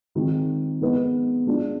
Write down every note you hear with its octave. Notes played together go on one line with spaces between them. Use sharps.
D#3 G#3 C4 F4 G#4
G#3 B3 D#4 B4 D#5
G#3 D4 F4